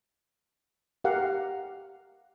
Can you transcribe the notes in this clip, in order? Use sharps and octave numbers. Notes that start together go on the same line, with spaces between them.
G4 A#4 F5 F#5